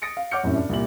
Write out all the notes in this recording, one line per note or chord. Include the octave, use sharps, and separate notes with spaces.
D#6 A6 A#6 C#7 D7
F5
C#5 F#5 D6 F6 G6 C#7
F#2 A2 C3 C#4
D4
C2 A#2 F#7